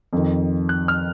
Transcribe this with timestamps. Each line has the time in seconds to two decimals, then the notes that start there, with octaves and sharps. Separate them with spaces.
0.13 F2 D#3
0.69 F#6
0.88 F6